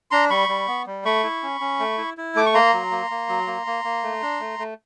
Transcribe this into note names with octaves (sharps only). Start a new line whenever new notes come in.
D4 A#5 C6
G3 B5 C#6
G3
B3
G3
A3 B5 C#6
E4
C#4
C#4
A3
E4
E4
A3 D6
C#6
A#3 A#5 C6
F#3
A#3
A#3
F#3
A#3
A#3
A#3
A3
D4
A3
A3